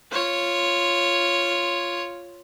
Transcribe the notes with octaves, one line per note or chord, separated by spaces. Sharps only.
F4 C#5